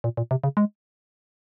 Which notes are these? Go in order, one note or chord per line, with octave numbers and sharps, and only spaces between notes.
A#2
A#2
C3
C#3
G#3